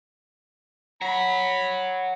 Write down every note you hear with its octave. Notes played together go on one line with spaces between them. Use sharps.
C#5 F#5 B5